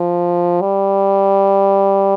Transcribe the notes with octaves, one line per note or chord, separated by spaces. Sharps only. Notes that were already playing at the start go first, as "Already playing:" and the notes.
Already playing: F3
G3